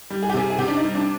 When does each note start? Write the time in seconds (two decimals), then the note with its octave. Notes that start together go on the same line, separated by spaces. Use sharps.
0.10 G3
0.23 G#4
0.30 G4
0.34 C3 G#4
0.50 G#4
0.58 C3 G4
0.68 D4
0.77 D#4
0.83 G3
0.95 D4